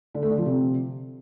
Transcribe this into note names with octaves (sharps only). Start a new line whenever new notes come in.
D3
A3
D3
F3
C3